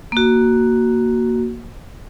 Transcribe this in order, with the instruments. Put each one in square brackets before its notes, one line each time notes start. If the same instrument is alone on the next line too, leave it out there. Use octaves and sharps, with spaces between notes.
[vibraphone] A#3 F#4